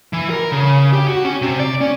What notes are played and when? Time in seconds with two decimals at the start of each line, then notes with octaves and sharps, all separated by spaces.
0.13 E3
0.30 A#4
0.52 C#3
0.93 G4
1.08 F#4
1.25 C#4
1.42 C3
1.59 D5
1.81 C#4